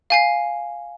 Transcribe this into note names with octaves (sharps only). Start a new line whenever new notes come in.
F5 G#5 C7